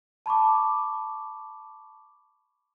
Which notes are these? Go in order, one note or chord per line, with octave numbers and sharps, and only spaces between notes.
A5 B5 C#6 D6